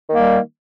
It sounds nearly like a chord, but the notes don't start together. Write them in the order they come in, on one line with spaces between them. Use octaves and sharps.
D#3 A#3 G3